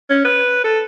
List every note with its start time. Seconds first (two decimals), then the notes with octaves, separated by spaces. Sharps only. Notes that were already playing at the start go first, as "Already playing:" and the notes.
0.10 C#4
0.25 B4
0.64 A4